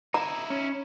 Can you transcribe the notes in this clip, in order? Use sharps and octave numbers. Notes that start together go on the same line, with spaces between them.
D#4 E4 A#5
C#4